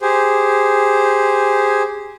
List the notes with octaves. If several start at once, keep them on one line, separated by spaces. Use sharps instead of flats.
G4 G#4 C5